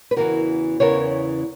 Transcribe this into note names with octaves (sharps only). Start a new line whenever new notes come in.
B4
E2 C#3 E3 B3 F#4 A#4
E2 C#3 E3 B3 A#4 C#5